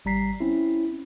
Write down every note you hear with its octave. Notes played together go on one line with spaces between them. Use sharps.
G#1 G3 A#5 B6 C7
C4 C#4 E4